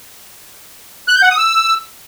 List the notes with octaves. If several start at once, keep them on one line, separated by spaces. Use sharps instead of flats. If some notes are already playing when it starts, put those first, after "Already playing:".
F#6
G6
F#5
D#6
E6